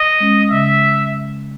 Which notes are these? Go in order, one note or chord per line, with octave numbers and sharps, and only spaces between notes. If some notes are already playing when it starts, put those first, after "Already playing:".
Already playing: D#5
G#3 C#4
C#3 E5